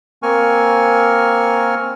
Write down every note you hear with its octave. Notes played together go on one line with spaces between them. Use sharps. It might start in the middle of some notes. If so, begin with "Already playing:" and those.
A#3 C4 A#4 G#5 C#6 F6